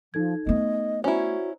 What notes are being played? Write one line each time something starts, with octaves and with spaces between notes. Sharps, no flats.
F3 D#4 A4 G#6
A3 B3 D#5
C#4 E4 F#4 C5 D5 A#5